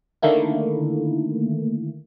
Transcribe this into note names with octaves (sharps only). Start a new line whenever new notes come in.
D3 D#3 A3 A#3 E4